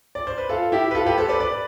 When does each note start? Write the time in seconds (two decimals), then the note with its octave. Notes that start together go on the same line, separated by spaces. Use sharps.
0.15 D5
0.27 C5
0.38 B4
0.49 F4 A4
0.72 E4 G4
0.91 B4
0.95 F4 A4
1.06 G4 B4
1.18 A4 C5
1.29 B4 D5
1.40 B4 D5